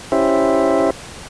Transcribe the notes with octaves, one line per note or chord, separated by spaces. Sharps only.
C#4 E4 G4 C5 E5